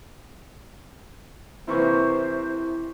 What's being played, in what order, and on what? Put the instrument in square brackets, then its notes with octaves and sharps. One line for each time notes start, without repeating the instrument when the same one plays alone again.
[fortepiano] C3 E3 A#3 [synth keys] E4 C#6 [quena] C5